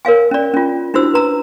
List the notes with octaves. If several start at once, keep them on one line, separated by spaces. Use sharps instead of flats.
A#4 C#5 F5 G#5
C#4 D5
C#4 F4
D4 E4 F#4 C5 E6
B4 A#5 E6